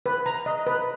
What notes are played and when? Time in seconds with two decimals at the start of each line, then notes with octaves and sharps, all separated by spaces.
0.06 B4
0.26 A#5
0.46 D#5
0.67 B4